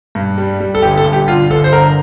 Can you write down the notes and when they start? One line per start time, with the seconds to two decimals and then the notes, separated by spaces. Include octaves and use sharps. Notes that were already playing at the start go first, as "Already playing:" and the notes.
0.15 G2
0.38 G3
0.60 G3
0.75 A4
0.82 G1 G4
0.97 A4
1.05 G2
1.13 G4
1.28 D3 F4
1.50 G1 A4
1.64 C5
1.72 D3 A#4